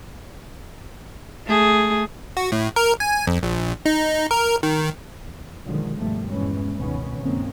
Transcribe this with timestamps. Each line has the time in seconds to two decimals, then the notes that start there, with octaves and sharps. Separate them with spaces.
1.46 A3 G#4
2.37 F#4
2.52 A2
2.76 A#4
3.00 G#5
3.27 F2
3.43 A#1
3.85 D#4
4.31 A#4
4.63 D#3
5.23 E2
5.63 B2 D3 D#3 F3 F#3 G#3
5.95 G2 B2 D#3 F3 G3 A3
6.28 E2 G2 A#2 E3 G#3 C#4
6.75 C#2 G#2 B2 D#3 B3 C#4
7.18 C#2 G2 D#3 A#3 C4 C#4